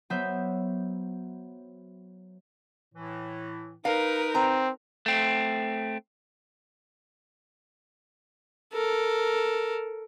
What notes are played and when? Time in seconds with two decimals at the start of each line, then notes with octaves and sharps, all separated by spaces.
0.10 F#3 B3 C5 E5 G6 B6
2.94 A2 E3
3.85 D#4 A#4 B4 F5
4.35 C4 A#5
5.06 A3 C4
8.73 A4 A#4